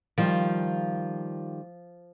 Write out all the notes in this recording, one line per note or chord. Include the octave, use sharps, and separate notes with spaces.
D#3 F3 G3 F4